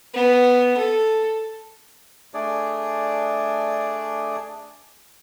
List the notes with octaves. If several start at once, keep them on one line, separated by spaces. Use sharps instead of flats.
B3
A4
A3 D4 G#4 D5